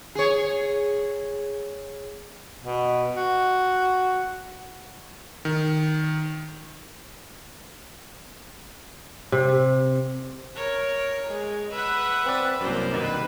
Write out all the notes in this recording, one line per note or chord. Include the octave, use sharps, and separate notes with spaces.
G#4 C#5
B2
F#4
D#3
C3
A#4 C#5
G#3
B4 E5 F#5
C4 B4 D5
C2 F#2 A#3 C5 D5
G2 B2 D#3 B4